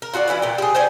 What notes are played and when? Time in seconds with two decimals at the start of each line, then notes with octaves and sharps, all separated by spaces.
0.02 A#4
0.14 F4 F#4 G#4 D5
0.28 E3 C#4 E4 B4
0.42 A#2 G5
0.58 G4 G#4
0.75 C5 D5 G5 G#5